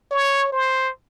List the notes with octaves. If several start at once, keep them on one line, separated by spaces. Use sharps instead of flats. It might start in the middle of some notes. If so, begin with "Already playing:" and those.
C#5
C5